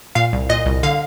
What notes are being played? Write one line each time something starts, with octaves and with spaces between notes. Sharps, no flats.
A#2 F5
C2
A#2 D#5
C2
D3 F5